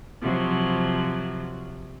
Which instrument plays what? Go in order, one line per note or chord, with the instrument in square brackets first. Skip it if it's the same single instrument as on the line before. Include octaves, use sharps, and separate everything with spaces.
[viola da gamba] C3 F3 F#3